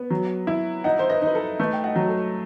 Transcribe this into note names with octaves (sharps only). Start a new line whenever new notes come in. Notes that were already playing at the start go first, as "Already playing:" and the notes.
Already playing: B3
F#3
E4
D#4 D#5 F#5
C5
B4 D#5
D#4
B4
A4
A3 B4
G5
D#5 F#5
F#3
A4